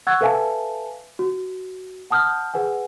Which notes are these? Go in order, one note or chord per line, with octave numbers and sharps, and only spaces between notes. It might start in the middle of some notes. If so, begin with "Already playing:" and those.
F#5 C#6 E6 F#6 G#6 A6
A4 B4 E5 F5 G#5 A5
F#4
F#5 A5 D#6 F6 G6
G#4 B4 F#5 G#5